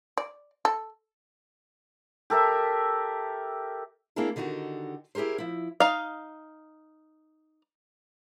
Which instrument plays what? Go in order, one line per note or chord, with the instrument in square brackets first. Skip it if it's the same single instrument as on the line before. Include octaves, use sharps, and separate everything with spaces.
[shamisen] D5
A4
[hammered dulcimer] G4 A4 A#4 E5
[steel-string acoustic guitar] A#3 C4 D4 E4 G#4 A#4
D3 D#3 D#4 F#4 G4
E4 G4 G#4 A#4 C5
F3 E4
[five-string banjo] D#4 F5